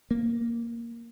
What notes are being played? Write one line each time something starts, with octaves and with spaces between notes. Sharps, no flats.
A#3